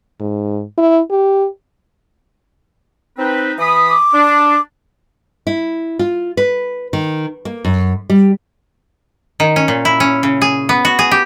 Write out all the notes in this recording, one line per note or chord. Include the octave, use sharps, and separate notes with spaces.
G#2
E4
G4
C4 D#4 B4
E3 B5 D#6
D6
D4
E4
F4
B4
D#3
A#3
F#2
G3
D#3
C#4
A#2
E4
C#4
C#3
G#4
B3
F#4
G#4
G4